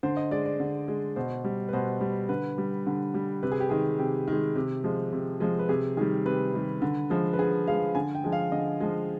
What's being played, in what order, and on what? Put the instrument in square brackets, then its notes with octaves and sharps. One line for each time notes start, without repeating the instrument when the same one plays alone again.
[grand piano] D3 C5
D#5
G#3 D5
D5
D3
G#3
B2 C5
G3
B4
B2 C5
G3
D3 B4
G3
D3
G3
C3 B4
G#4
G4
D#3 G#3 G#4
C3 G4
D#3 G#3
C3
F3 G#3
C3
F3 G#3
B4
C3 G#4
D#3 G3 G#4
C3 B4
D#3 G3
D3
F3 G#3
B4
D3 G#4
F3 G#3 F5
D3 G#5
G5
F3 G#3
F5
D3 D#5
F3 G#3